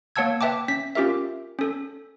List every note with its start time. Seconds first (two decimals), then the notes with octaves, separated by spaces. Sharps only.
0.16 A#3 C#5 F#5 A5 E6 G#6
0.41 B4 E5 G5 A5 D6
0.68 C#4 B6
0.95 C#4 F4 G4 A#4 E5
1.59 C#4 A4